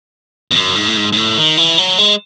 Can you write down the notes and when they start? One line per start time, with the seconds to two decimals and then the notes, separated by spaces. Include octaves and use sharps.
0.51 E2
0.56 F#2
0.76 G#2
0.88 A2
0.97 G#2
1.13 G#2
1.17 A2
1.37 D#3
1.57 E3
1.78 F#3
1.99 G#3